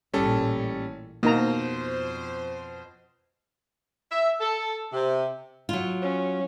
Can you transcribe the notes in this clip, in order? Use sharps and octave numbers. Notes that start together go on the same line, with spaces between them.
A1 A#2 G3 C#4 A4
F2 B2 A#3 D#4 C5 A#5
E5
A4
C3
F#3 F4
C#4